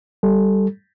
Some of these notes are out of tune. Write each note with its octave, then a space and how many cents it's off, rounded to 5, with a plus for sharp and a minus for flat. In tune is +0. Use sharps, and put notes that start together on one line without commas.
G3 -5 A4 +0